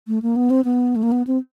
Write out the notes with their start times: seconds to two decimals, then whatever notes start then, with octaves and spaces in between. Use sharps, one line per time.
0.08 A3
0.22 A#3
0.36 B3
0.50 C4
0.65 B3
0.96 A3
1.03 A#3
1.12 B3
1.27 C4